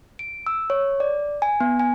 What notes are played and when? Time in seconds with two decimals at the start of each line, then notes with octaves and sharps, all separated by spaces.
0.19 D7
0.46 E6
0.70 C#5
1.00 D5
1.42 G#5
1.60 B3
1.79 G#5